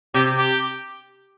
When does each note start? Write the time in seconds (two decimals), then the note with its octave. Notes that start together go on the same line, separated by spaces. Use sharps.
0.14 C3 G4
0.38 G4